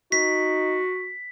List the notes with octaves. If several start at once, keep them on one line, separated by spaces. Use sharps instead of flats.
D#4 F#4 B6